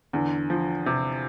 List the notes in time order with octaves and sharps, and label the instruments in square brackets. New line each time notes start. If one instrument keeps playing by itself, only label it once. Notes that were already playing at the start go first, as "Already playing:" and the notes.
[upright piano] E2 [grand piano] D3
[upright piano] F3
C3